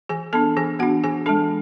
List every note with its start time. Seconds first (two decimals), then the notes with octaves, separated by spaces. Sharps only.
0.09 E3 G#4 G#5
0.33 B3 D4 A4 A5
0.57 E3 G#4 G#5
0.79 B3 F#4 F#5
0.83 D4
1.04 E3 G#4 G#5
1.26 G#3 D4 A4 A5